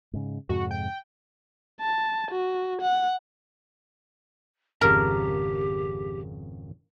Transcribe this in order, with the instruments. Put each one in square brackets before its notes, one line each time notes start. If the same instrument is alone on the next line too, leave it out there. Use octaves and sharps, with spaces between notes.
[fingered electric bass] G#2 C#3
[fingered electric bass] F2 G#2 C3 [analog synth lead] F#4
[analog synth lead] G5
[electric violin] A5
F#4
F#5
[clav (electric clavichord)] G#1 F2 C#3 [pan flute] G4 [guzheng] A#4